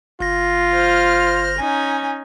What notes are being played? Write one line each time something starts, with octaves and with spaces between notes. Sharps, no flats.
G1 F4 A#6
C5 F6
C#4 D#4 G#5